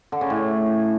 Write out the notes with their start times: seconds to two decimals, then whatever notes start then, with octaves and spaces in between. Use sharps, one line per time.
0.12 D3
0.21 C#3
0.30 A2